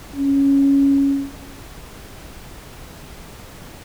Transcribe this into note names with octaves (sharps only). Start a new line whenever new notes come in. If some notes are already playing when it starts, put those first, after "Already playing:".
C#4